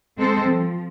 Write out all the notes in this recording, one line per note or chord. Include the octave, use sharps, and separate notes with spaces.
G#3 C4 A4 C5
F3